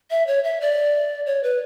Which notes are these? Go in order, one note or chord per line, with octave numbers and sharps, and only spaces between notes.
E5
C#5
E5
D5
C#5
B4